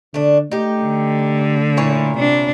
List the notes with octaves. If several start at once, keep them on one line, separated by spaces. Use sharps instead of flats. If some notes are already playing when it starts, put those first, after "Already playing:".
D3 A3 D4
A3 D#4 G4
D3
A#2 E4 C#5
C3 D4